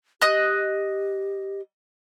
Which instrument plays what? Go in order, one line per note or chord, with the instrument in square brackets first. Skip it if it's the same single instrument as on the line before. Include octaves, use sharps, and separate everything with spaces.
[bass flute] G4 [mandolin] D#5 F#6